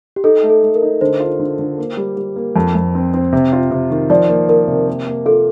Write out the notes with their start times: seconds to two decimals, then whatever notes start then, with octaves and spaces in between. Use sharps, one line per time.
0.16 G4
0.24 D#4 A4
0.43 A3
0.49 A4
0.63 A3
0.76 A#4
0.82 D#4
1.01 D3 C5
1.20 F4
1.40 D3
1.59 D3
1.78 A#3
1.97 G3
2.17 G3
2.36 A#3
2.56 F2
2.75 F2
2.95 C4
3.14 C4
3.33 C3
3.53 F4
3.71 C3
3.90 D#3
4.10 F3 D5
4.29 A#3
4.49 A#3 A#4
4.68 C3
4.88 A#3
5.07 A#3
5.26 F4 A4